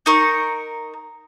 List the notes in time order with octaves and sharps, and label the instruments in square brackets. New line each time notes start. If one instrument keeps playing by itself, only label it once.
[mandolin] D#4 A#4 C#6